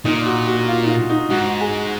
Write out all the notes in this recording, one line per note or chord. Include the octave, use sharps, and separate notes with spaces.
A#2 D#4
F#4
F#4
F4
D#4
F4
D#4
G#2 F#4
G#4